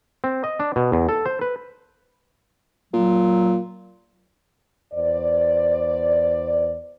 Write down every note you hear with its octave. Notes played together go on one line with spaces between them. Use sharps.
C4
D#5
D4
B2
E2
A4
C5
B4
A#2 F#3
E2 C5 D5